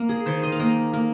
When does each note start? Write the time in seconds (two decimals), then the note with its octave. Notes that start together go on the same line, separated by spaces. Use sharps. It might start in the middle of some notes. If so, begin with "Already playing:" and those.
Already playing: A#3
0.09 G#4
0.26 D#3 C5
0.43 D#5
0.52 F5
0.60 A#3 D#5
0.93 A#3